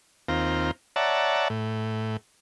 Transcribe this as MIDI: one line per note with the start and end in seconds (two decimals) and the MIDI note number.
0.28 0.71 39
0.28 0.71 60
0.28 0.71 65
0.28 0.71 82
0.96 1.48 73
0.96 1.48 74
0.96 1.48 76
0.96 1.48 78
0.96 1.48 81
0.96 1.48 82
1.50 2.17 45